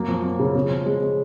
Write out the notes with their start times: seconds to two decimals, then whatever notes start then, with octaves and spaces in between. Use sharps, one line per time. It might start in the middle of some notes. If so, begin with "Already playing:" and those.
Already playing: F#2 A#3
0.08 F3
0.24 A#3
0.39 C#3
0.55 C#3
0.71 F3
0.86 G#3
1.01 G#3